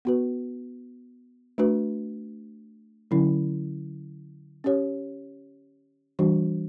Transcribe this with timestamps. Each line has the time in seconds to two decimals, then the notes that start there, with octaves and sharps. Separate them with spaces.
0.05 B3 F#4 B4
1.58 A3 D4 F#4 B4
3.11 D3 F#3 C#4 E4
4.64 C#4 G4 C#5
6.19 E3 G3 D4 F#4